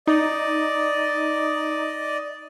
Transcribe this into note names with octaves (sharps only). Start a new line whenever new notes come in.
D#4 D5 D#5